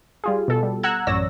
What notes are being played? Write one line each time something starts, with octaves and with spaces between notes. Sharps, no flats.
G3 F4 G#4
B2 A4
G3
F#5 A#5 E6 F#6 G#6
A1 F#2 C#5 D5 E6 A#6